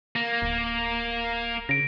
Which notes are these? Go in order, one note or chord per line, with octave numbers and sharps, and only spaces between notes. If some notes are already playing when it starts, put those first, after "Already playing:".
A#3 A#6
D1
C#3 A#6 D7